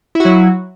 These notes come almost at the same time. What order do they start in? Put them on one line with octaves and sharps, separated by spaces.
E4 F#4 F#3